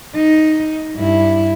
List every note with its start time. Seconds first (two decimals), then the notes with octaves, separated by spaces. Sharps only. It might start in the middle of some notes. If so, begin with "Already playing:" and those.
0.15 D#4
0.96 G2 E4